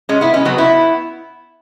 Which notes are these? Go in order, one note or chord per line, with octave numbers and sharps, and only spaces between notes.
G#3 C#4
B3 E4
G#3 C#4
F#3 B3
B3 E4